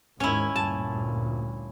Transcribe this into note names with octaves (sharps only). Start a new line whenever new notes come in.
D#2 G#2 D#3 C#4 E4
D2 G2 A#2 A5